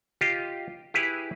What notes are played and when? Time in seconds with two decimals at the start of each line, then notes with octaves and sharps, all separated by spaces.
0.21 F4 G4 D#5
0.94 E4 G4 G#4 B4